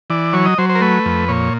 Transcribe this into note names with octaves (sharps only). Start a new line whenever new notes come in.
E3 D5
F#3 C#5
D#5
F#3 C5
C5
A#4
A3 B4
F2
A#2 C#5